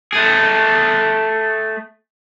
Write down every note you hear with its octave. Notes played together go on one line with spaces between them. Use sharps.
A3 G#4